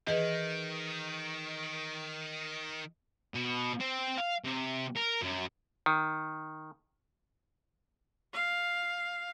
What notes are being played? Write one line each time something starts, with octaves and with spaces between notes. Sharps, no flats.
D#3 E3 G#4 B4 D#5
B2
C4
F5
C3
A#4
F#2
D#3
F5